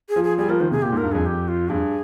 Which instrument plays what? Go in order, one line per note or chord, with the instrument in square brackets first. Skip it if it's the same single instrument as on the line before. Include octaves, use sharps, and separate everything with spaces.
[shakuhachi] G#4
[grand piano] F3
[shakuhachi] G#4
[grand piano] G3 [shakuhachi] G#4
[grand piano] F3 [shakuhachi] A#4
[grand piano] D#3 [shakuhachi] C5
[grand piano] C3 [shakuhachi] G#4
[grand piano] A#2 [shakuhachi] G4
[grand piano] G#2 [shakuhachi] A#4
[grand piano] G2
[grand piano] F2 [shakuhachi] G#4
[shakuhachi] G4
F4
[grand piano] G2 [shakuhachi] G#4